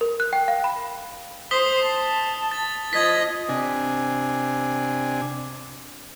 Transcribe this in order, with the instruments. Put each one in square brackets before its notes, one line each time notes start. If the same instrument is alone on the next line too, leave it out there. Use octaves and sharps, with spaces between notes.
[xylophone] A#4
F#6
G5
F5
B5
[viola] C5 [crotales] D#6 B6 G7
[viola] A5
[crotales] A6
[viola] F3 D#5 [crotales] G#6 A6 B6
[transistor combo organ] C3 D4 G#5